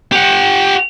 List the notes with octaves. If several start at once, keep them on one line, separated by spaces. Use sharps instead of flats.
G4 F#5